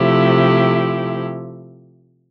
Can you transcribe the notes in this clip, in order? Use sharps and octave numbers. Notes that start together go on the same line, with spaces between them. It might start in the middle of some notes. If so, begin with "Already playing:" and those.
Already playing: C3 F3 A3 E4 G4